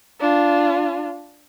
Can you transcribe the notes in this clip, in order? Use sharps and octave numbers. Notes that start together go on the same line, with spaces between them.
D4 F4